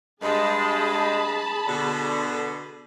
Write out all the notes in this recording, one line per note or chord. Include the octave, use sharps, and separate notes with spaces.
G2 G#3 G#4 A5 B5
B2 D3